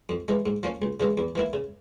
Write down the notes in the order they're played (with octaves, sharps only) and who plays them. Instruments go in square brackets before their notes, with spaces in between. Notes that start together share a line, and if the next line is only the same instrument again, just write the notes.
[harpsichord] F2
E3 G#3
G#2
F3 A#3 C#4
C#2
C#3 E3 G#3
E2
E3 A#3 E4
C#3